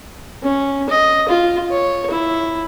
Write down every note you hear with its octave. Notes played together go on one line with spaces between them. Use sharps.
C#4
D#5
F4
C#5
E4